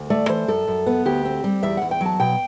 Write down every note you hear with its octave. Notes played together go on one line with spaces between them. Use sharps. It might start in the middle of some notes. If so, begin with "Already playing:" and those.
Already playing: D2
A3 D5
E3 C5
F#2 A4
F#2
B3
D2 G4
C4
G3
E2 E5
E2 F#5
G5
F#3 A5
B2 G5